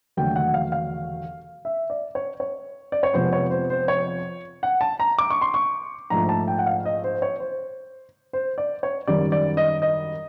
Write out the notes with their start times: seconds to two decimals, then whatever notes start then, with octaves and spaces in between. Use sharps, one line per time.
0.17 E1 D#2 D3 F#3 A3 G5
0.36 F#5
0.54 F5
0.72 F5
1.65 E5
1.90 D5
2.15 C#5
2.40 C#5
2.92 D5
3.03 C#5
3.13 F2 C3 F3 G#3 B3 C5
3.33 C#5
3.51 C5
3.70 C5
3.88 C#5
4.63 F#5
4.81 A5
5.00 A#5
5.18 D6
5.30 C#6
5.41 C6
5.54 C#6
6.10 A#1 G#2 F3 A3 A#5
6.29 A5
6.48 G5
6.59 F#5
6.66 F5
6.85 D#5
7.04 C5
7.22 C#5
7.40 C5
8.33 C5
8.58 D5
8.83 C#5
9.07 G#1 F#2 D#3 G3 D5
9.32 D5
9.57 D#5
9.82 D#5